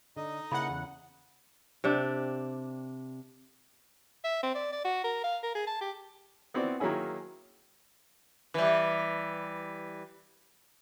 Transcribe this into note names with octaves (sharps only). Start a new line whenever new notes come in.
D3 D#4 D#5
C#3 A#3 E4 F#5 B5
E2
C3 D4 G4
E5
C4
D5
D5
F#4
A#4
F5
A#4
G#4
A5
G4
B3 C4 E4 F#4 D5
D#3 F#3 A#3 C#4 E4 G#4
E3 G3